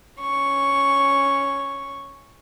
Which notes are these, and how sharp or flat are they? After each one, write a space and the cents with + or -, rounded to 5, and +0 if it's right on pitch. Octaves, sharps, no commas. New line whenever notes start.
C#4 +0 C#6 +0